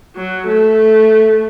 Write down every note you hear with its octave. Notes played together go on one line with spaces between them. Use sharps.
F#3
A3